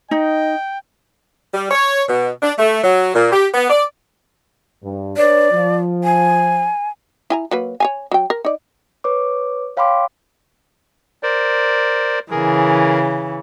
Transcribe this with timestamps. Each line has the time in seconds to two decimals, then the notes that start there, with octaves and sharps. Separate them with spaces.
0.11 D#4 D#5 G5
1.54 G3
1.71 C#5
2.09 B2
2.43 D4
2.58 A3
2.84 F#3
3.15 A#2
3.33 G4
3.54 B3
3.70 D5
4.83 G2
5.17 D4 B4 C#5 D5
5.52 F3
6.04 G#5
7.30 E4 G#5 A#5
7.51 F#3 A#3 B4
7.80 C#5 F5 G#5
8.11 F#3 G5
8.30 A#4
8.45 D#4 D5
9.04 B4 C#5 D6
9.77 C#5 F5 G5 B5 C6 D6
11.23 A#4 C5 D5
12.31 C#3 E3 G#4 A#4